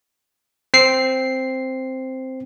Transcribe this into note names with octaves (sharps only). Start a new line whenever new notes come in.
C4 C7